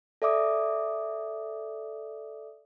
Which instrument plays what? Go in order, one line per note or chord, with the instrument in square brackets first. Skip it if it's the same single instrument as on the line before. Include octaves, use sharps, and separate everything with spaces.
[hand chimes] A4 D5 E5 D6 D#6